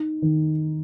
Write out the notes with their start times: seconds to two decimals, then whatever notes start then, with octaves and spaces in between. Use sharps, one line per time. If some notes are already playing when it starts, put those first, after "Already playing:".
Already playing: D#4
0.22 D#3